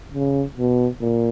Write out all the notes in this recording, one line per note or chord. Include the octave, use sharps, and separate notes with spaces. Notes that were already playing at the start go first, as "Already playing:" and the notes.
C#3
B2
A#2